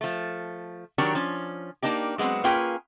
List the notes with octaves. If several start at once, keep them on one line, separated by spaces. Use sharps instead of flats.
F3 A3
D#3 F#3 D4 G4 A#4
F3 C#4
A#3 D4 D#4 G4
F#3 G#3 B3 C4 F#4
A#3 C#4 F4 G#4 B4 G5